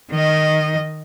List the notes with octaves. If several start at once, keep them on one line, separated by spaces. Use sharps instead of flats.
D#3 D#5